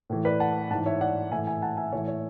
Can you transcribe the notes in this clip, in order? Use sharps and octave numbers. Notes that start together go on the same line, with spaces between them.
A2 E3
B4 D5
F#5 A5
G#2 E3 F#5 A5
C#5 E5
D5 F#5
A2 E3 E5 G#5
E5 G#5
F#5 A5
E5 G#5
A2 E3 C#5 E5
C#5 E5